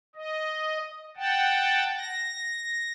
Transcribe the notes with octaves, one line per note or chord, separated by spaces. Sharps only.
D#5
F#5 G5 A5
A#6